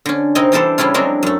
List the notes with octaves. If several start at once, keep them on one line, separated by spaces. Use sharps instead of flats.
D3 C#4
C3 C4 D#4 A#4 D#5 G#5
E3 G3 D4 G4 A4 C5
C#3 G3 C#4 E4 F4
F#3 G#3 C4 D4 F#4 A#4
F#2 A3